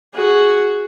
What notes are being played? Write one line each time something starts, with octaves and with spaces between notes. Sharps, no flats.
F#4 G#4